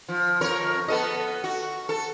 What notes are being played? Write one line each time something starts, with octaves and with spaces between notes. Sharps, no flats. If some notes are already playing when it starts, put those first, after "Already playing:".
F3
F2 A#4 C#5
B3 A4 D#5
F#4
A4